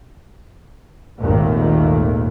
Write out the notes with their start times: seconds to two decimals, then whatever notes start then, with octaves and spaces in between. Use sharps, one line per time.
1.20 G#1 D#2 A#2 D#3 A3